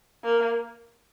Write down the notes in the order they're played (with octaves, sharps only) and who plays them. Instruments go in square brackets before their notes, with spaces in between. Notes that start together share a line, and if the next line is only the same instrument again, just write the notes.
[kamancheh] A#3